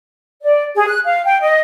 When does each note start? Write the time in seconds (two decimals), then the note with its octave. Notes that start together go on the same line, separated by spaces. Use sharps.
0.43 D5
0.75 G#4
0.87 F#6
1.05 F5
1.24 G5
1.41 D#5